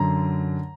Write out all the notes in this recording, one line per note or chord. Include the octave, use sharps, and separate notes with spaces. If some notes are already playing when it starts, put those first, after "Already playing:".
Already playing: F#2 D3 A#5